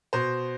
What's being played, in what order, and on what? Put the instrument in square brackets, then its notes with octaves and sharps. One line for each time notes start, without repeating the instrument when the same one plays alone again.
[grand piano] B2 C5